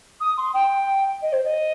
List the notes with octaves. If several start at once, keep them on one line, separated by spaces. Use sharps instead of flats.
D#6
C6
G5
D#5
C5
D#5